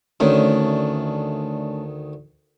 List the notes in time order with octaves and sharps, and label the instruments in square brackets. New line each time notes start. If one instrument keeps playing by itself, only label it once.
[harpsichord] D2 D#3 [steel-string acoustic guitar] A3 C#4 D4